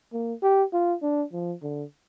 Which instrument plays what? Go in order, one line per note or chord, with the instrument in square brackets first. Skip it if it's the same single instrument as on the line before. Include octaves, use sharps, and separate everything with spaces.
[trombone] A#3
G4
F4
D4
F3
D3